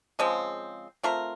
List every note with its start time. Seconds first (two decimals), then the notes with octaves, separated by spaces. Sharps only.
0.19 C#3 F3 G#3 C4
1.03 A3 C4 F4 A#4